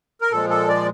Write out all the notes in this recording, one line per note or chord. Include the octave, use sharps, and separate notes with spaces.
A#4
A#2 F3 G#3 A4
A4
D5